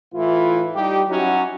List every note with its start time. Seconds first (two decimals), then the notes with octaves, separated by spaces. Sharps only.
0.14 A2 E3 E4 F4
0.75 G3 D#4 G4
1.09 F#3 C#4 D#4 E4 F#4